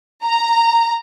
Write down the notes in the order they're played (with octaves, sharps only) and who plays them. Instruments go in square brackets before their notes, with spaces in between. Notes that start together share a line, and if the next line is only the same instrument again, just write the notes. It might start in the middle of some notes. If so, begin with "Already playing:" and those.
[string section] A#5